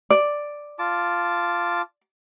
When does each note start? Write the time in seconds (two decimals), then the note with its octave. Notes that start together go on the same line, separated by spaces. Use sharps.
0.10 D5
0.79 F4 A5 D6